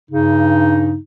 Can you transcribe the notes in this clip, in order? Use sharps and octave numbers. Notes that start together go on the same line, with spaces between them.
G2 C#3 D#4